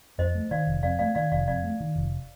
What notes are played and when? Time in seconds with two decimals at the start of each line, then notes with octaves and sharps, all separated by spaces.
0.18 F2 C5 D#5
0.35 A3
0.51 D#3 D5 F5
0.67 F1
0.83 F2 D5 F5
0.99 A3 D5 F5
1.15 D#3 D5 F5
1.32 F1 D5 F5
1.48 F2 D5 F5
1.64 A3
1.80 D#3
1.96 F1